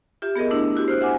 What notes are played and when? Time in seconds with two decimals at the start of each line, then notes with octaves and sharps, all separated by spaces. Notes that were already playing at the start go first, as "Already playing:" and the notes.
0.22 F4 G4 E5
0.36 B3 G#4 A#4 D#5
0.51 A3 D4 E4
0.75 E4 F#4 G4
0.88 C5 F6 F#6
1.01 E5 F#5 G#5 D6